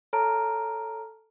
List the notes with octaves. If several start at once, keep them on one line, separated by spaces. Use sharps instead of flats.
A4 C#5 A5 A#5 F6 D7